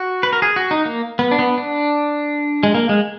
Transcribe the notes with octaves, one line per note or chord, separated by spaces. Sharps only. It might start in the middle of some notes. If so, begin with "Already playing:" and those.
Already playing: F#4
B4
A#4
G#4
F#4
D#4
A#3
B3
D4
B3
D4
G#3
A#3
G#3